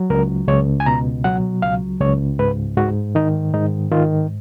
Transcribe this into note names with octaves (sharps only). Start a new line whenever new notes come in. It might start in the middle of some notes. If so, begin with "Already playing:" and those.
Already playing: F#3
C#2 A#4
C#2 C#5
G#5
B2 A#5
F#3 F#5
C#2 F5
C#2 C#5
G#2 B4
G#2 F#4
D#3 D#4
G#2 D#4
D#3 F4